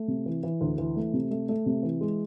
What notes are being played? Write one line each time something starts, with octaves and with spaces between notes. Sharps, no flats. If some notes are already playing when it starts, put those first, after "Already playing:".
Already playing: A3
C3
E3
E3
D2
E3
A3
C3
A3
A3
C3
E3
G#3